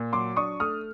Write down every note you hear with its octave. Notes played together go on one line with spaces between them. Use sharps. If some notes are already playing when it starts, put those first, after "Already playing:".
Already playing: A#2
F#3 C6 D6
D4 C#6 D#6
A3 D#6 F6